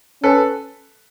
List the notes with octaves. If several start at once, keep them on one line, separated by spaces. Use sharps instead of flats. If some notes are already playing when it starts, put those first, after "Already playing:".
C#4 A4 B4